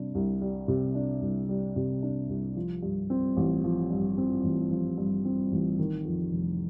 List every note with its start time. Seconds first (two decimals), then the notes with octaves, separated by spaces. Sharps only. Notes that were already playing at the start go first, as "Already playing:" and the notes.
Already playing: C3 G3 D4
0.15 C2
0.41 G3
0.68 C3
0.95 D4
1.22 C2
1.49 G3
1.76 C3
2.03 D4
2.29 C2
2.56 F3
2.83 G2
3.10 C4
3.37 A1
3.64 F3
3.91 G2
4.18 C4
4.44 A1
4.71 F3
4.98 G2
5.25 C4
5.52 A1
5.79 D#3
6.05 F2
6.32 F1